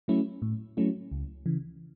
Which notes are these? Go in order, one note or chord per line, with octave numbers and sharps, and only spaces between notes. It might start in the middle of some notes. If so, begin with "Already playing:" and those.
F#3 A3 C#4 E4
A2
F#3 A3 C#4 E4
C#2
C#3 E3